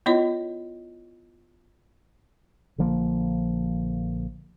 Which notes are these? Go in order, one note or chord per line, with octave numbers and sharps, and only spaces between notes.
B3 E4 F4 C#5 D#5
A#1 D3 F3 A#3